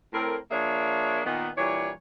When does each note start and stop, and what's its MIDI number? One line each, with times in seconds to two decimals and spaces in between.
0.13 0.36 45
0.13 0.36 60
0.13 0.36 70
0.51 1.20 53
0.51 1.20 58
0.51 1.20 62
0.51 1.20 68
0.51 1.20 73
0.51 1.20 76
1.25 1.48 46
1.25 1.48 51
1.25 1.48 59
1.57 1.90 46
1.57 1.90 52
1.57 1.90 55
1.57 1.90 62
1.57 1.90 73